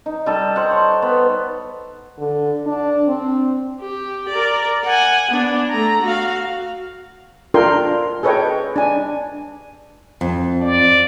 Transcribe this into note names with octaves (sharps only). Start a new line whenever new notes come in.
D#4
G3 A4 D#5
C5 F#5
C#5
B3
D3
D4
C4
G4
A#4 D5
F#5 G#5
B3 D4
A3 A#5
F#4 F5
D4 F4 A4 A#4 G5 C6
G#4 A4 B4 C#5 D#5 G5
D4 G#5
F2
D5